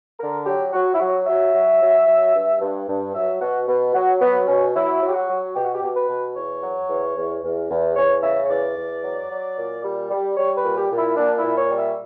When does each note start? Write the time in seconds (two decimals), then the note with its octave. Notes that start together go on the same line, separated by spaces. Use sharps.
0.20 D3 A#4
0.46 F#3 G4
0.73 F#3 F#4
0.94 E4
0.99 F#3 F#4
1.26 F#3 E5
1.53 F#3
1.81 F#3
2.06 F#3
2.33 G2
2.60 G2
2.87 G2
3.14 F#3 E5
3.40 B2 F#4
3.68 B2
3.94 F#3 F#4
4.21 F#3 B3
4.47 B2 C#4
4.74 F#3 E4
5.01 F#3
5.08 G4
5.14 F#4
5.28 F#3
5.54 B2 G4
5.64 F#4
5.74 G4
5.82 B2
5.95 B4
6.08 B2
6.35 E2 C#5
6.62 F#3
6.88 E2
7.16 E2
7.42 E2
7.69 E2
7.96 E2 C#5
8.22 C#3 E5
8.44 C#5
8.49 E2 D5
8.76 E2
9.03 F#3
9.29 F#3
9.56 A#2
9.84 G3
10.10 G3
10.37 G3 C#5
10.57 B4
10.63 A#2
10.77 G4
10.90 A#2
10.97 E4
11.17 A#2 D4
11.37 E4
11.43 A#2
11.56 C#5
11.70 G3
11.77 E5